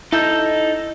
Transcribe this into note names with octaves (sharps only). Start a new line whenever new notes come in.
D#4 E4 A4 G6